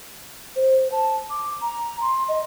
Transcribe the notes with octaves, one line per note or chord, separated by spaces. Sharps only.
C5
A5
D6
A#5
C6
D#5